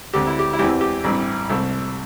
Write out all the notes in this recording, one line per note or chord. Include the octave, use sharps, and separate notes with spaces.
D2 D3 C4 G4
E4
G4
E4
E2 E3 C4 G4
G4
A1 G2 E3 C4
C2 C3 A3 C4